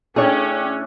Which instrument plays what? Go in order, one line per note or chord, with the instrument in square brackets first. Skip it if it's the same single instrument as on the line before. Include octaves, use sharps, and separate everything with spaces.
[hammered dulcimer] A2 D4 [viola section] C#4 [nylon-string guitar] G#4 C#5 [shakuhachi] G5